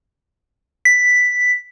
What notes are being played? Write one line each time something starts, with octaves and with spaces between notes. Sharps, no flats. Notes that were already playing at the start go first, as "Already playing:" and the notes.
B6